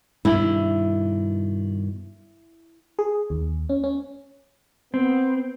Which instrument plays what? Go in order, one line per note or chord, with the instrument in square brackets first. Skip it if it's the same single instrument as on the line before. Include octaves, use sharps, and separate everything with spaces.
[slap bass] G2 B2 D#3 [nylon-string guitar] E4
[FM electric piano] G#4
D#2
C#4
C#4
[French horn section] B3 [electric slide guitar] C4